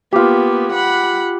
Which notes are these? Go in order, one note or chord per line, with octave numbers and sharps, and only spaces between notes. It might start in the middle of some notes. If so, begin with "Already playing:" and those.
A#3 B3 F4 G4
F#5 B5